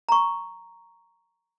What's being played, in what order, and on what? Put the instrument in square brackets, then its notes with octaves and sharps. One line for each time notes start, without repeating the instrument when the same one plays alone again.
[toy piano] A#5 C#6